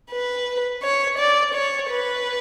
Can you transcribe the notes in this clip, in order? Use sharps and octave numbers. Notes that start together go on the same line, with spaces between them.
B4
C#5
D5
C#5
B4